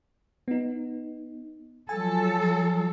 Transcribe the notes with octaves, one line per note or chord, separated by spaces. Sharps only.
B3 D#4
F3 F#3 A4 G#5